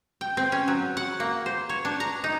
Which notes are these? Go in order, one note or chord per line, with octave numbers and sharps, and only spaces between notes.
G5
C4
C#4
F#3
F#5
A#3
C5
C#5
D4
A#5
D#4